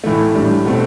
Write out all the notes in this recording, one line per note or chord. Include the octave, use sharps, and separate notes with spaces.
A2 E3 A3
A2 G3 D4
B2 A3 C4